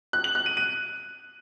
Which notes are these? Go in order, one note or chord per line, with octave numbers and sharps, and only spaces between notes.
F#6
F#7
F#6
D#7
D#7